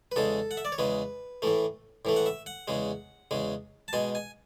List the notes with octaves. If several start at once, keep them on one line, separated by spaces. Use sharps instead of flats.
B4
E2 C#3 G#3 A4
F#5
E5
D5
C#5
E2 C#3 G#3 B4
A2 E3 A3
A2 E3 A3
F#5
E5
F#5
E2 C#3 G#3
E2 C#3 G#3
A5
B2 G#3 G#5
G#5